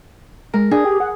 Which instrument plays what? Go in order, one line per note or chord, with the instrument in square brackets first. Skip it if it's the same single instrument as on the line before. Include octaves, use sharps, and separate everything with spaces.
[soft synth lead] G#3 [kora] A#4
[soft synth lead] D4 [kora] G#4
[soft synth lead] G4
F#5